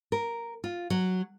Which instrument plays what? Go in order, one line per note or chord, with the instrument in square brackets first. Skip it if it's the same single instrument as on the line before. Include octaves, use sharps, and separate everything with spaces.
[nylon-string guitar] A#4
F4
F#3